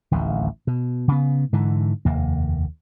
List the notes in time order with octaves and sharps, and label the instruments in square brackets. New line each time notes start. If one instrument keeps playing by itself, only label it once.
[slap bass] D1 A1 D#2
B2
C#3 B3
G#2 D3 E3
F1 D#2 A#3